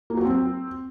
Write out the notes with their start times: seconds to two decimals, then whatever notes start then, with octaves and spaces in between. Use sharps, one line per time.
0.10 A#3
0.17 F#3
0.25 C4